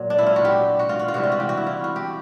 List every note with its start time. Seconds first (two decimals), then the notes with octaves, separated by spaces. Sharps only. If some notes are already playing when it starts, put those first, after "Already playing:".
Already playing: A#2 F#3
0.10 D4
0.18 E4
0.27 F4
0.36 F#4
0.45 G4
0.79 F#4
0.89 F4
0.99 F#4
1.08 F4
1.14 C3 E3 G3 F#4
1.23 F4
1.32 F#4
1.40 G4
1.49 F#4
1.57 E4
1.67 F4
1.84 F#4
1.96 G4